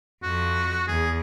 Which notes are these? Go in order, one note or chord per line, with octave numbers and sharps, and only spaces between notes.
F2 F#4
E2 G#4